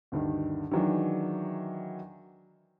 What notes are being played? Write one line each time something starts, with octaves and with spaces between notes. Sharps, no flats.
D2 G2 D#3
D#3 E3 F#3 G#3 D4